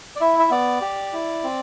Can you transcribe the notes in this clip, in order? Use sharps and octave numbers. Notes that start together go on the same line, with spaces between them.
D5
E4 E5
E5
B3 D5
G4
E4
C4